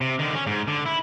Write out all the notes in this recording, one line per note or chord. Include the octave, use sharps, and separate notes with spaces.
C3
D3 D#3
C#4
G#2
D3
E4